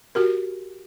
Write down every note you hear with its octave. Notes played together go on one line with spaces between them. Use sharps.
F#4 G4 A#4